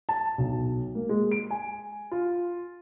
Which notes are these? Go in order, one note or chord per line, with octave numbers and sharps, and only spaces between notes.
A5
B1
A#3
G#3
D7
G#5
F4